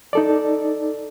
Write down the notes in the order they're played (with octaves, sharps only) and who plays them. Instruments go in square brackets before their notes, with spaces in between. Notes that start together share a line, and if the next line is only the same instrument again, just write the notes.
[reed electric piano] D#4 A4 D5